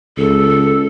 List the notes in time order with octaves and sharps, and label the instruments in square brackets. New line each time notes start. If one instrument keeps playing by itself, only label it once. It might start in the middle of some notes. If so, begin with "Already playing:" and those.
[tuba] C#2 [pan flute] A4